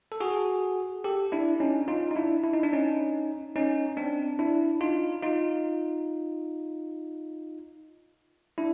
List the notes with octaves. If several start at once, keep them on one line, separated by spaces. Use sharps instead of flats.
A4
F#4 G#4
G4 A4
D4 E4
C#4 D#4
D#4 F4
D#4
D4 E4
E4
D#4
D4
C#4 D#4
C#4 D#4
C4 D4
D4 E4
D#4 F4
D#4 F4
D4 E4